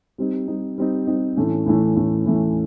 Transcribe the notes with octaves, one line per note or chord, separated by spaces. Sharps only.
G3 C4 D#4
G3 C4 D#4
G3 C4 D#4
G3 C4 D#4
A2 E3 A3 C#4
A2 E3 A3 C#4
A2 E3 A3 C#4
A2 E3 A3 C#4